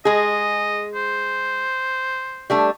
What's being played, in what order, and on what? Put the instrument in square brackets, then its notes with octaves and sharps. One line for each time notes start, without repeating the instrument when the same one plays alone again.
[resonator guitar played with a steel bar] G#3 G#4 [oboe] D#5
[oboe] C5
[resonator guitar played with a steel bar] G3 A3 D4